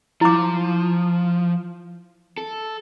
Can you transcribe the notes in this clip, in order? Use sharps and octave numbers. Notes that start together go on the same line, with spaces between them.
F3 E4 D6
A4